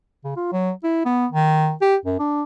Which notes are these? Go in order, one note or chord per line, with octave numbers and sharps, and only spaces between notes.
C#3
F4
F#3
E4
B3
D#3
G4
F#2
D4